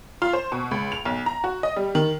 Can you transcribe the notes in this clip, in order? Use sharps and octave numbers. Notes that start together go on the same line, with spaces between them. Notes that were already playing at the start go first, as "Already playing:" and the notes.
F4
C5
B2
C#2
F7
B1
A#5
F#4
D#5
G3
D#3